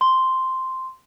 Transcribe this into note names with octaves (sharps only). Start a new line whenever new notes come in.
C6